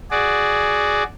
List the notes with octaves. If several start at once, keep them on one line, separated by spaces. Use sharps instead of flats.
F#4 G#4 D5